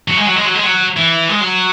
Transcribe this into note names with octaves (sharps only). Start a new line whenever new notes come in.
F#3
G#3
F#3
G#3
F#3
G#3
F#3
E3
G#3
F#3